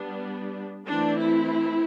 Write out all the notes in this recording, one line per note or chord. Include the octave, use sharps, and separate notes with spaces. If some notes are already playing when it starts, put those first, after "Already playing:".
Already playing: G3 B3 D4
E3 A3 C4 D4
E4